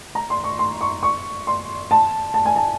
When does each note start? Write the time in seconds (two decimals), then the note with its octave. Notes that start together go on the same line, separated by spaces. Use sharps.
0.15 A#5
0.30 C6
0.44 C#6
0.59 C6
0.81 C#6
1.03 C#6
1.47 C6
1.91 A5
2.34 A5
2.46 G#5
2.56 A5